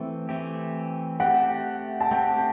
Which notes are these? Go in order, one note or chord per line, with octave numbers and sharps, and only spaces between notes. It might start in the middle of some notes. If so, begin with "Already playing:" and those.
Already playing: E3 A3 C4
E3 A3 C4 G4
A3 C4 G4 F#5
A5
A3 C4 G4 G5